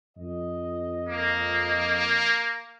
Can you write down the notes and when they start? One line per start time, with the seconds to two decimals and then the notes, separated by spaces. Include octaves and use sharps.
0.18 F2 D#5
1.09 A#3